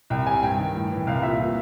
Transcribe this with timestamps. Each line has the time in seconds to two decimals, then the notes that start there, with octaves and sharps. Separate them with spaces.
0.10 C2 G5
0.26 C3 G#5
0.43 G2 G5
0.59 D#3
0.75 A2
0.91 E3
1.07 C2 F5
1.18 F5
1.23 A#2 E5
1.39 A#2